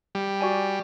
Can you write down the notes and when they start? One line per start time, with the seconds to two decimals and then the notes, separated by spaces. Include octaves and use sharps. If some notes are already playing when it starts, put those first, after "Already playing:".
0.15 G3
0.41 F#4 D5 G#5